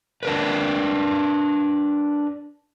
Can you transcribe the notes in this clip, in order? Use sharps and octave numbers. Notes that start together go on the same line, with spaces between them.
D4 A#4 B4